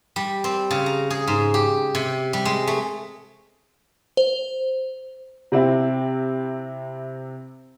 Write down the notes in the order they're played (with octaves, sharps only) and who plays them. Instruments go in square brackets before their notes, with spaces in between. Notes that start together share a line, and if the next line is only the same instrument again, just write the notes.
[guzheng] G3
C4
C#3
A#5
G#4
G#2
G4
C3
G3
G#3
A3
[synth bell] C5
[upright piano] C3 C4 E4